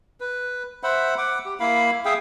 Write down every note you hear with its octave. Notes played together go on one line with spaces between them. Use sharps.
B4
C5 E5 F#5 B5
F#5 D6
G4
A#3 E4 F5 B5
G#4 E5 F5 G5